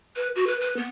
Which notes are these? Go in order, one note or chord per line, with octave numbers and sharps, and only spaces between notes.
B4
F#4
B4
B4
B3